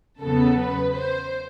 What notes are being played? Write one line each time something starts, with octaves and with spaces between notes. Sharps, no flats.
E2 C#3 F#3 B3 A4
B4
C5